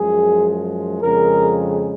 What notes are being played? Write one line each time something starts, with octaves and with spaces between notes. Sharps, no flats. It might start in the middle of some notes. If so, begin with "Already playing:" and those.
Already playing: F#2 F3 G#3 G#4
F2 C#3 G#3 A#4